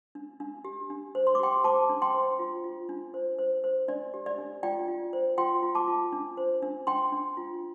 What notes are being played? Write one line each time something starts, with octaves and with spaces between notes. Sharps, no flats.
D4
D4
G4
D4
C5
C6
D6
G4 G5 C6
C5 A5 D6
D4
G5 C6
C5
F4
F4
D4
C5
C5
C5
D4 D5
G4
D5
D4
F4 D5 G5
F4
C5
F4 G5 C6
F4
A5 D6
F4
D4
C5
D4
D4 G5 C6
D4
F4